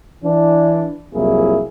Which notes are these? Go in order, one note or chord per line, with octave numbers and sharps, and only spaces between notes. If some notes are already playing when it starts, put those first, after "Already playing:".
E3 D4
C2 F2 F#3 A#3 E4 G#4